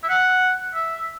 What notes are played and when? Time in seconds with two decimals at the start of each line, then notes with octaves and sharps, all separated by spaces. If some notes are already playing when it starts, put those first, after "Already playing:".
0.03 E5
0.09 F#5
0.74 E5